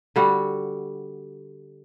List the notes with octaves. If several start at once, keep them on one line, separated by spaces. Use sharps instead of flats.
D3 G3 F#4